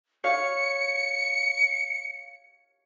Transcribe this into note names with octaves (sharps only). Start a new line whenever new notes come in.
C#5 F5 C#7